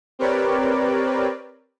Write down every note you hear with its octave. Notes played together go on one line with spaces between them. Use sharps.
C4 G4 A#4 B4 C#5 D5